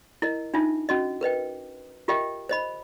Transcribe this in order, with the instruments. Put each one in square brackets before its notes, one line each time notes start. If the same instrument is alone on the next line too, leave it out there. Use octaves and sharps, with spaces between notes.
[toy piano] E4 A#4 D#5
D4 D#4 F4 E5
C#4 F#4 D#5
A#4 B4 D#5 G5
F4 G4 A#4 D#5 E5 G5
C5 D#5 B5